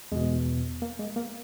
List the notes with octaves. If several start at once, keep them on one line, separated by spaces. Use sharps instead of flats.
E2 B2 G#3
A#3
G#3
A#3